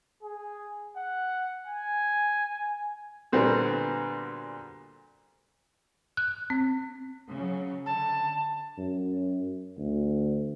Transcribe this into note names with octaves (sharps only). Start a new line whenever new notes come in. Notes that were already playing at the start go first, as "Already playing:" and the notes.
G#4
F#5
G#5
A#2 D3 G3 B3 C4 F#4
F#6
C4
C#3 F#3
D3 A5
F#2
D2